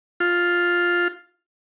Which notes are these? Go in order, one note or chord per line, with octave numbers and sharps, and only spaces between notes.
F4